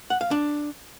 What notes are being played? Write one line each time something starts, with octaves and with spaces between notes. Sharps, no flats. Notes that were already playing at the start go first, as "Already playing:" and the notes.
F#5
F5
D4